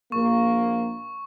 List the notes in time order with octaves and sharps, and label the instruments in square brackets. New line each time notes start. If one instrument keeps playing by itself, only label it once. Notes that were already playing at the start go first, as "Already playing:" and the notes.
[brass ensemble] A#1 A#3 [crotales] C#6